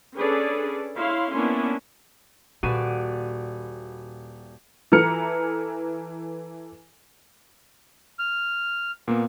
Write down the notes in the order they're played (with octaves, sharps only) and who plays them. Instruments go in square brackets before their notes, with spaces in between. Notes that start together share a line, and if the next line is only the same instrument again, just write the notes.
[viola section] C#4 D4 G#4 A4 B4 D5
E4 C#5 F5 C6
A#3 B3 C#4 D4 E4
[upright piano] D#1 D#7 [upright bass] A#2 [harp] F#4 B4 D5
[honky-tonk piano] E3 E4 A4 A#5 F6 C#7
[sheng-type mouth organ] F6
[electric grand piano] A#2 A#3 B3